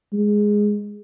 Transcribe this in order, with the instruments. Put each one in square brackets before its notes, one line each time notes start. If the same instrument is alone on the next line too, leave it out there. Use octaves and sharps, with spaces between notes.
[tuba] G#3